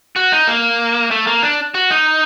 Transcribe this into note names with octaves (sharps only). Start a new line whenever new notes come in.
F#4
D#4
A#3
A3
A#3
D4
F#4
D#4